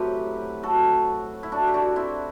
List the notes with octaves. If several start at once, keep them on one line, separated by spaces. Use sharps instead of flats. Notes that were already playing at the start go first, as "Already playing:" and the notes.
Already playing: A2 F#3 C4 G4 B4
F#4 A4
E4
D4 F#4
G4
D4 F#4
C4 E4